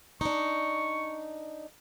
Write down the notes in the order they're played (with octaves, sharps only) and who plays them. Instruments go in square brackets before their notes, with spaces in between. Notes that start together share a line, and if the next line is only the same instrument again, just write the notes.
[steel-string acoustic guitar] D4 D#4 [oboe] C#6